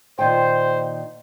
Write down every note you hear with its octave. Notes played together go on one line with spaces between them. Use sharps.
A#2 D#3 C5 G5